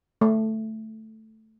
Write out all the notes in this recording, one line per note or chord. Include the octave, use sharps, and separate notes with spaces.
A3